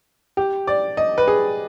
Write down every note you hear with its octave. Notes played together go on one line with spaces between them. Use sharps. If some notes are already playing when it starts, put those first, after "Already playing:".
G4
D5
D#5
B4
G#4